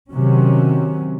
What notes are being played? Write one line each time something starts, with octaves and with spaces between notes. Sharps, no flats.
C3 D#3 F#3 C#4